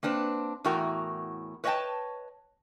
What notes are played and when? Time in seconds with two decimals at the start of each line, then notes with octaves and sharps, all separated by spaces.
0.03 A#3 C4 D4 B4
0.64 E2 A2 F#4 A#4 G5 A#5
1.64 B4 C#5 D#5 E5 G5 A5